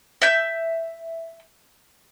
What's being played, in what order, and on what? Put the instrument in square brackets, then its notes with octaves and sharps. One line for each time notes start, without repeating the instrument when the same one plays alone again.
[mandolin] E5 G6